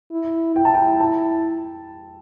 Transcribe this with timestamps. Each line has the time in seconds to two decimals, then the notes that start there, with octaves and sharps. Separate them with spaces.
0.11 E4
0.55 E4 G5
0.65 A5
0.74 G5
1.00 A5